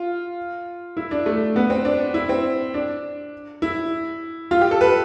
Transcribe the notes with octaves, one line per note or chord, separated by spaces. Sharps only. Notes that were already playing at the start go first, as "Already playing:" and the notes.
Already playing: F4
E4
D4
A3
B3
C4
D4
E4
C4
D4
E4
F4
G4
A4
B4